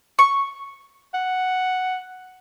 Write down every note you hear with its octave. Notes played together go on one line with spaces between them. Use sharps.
C#6
F#5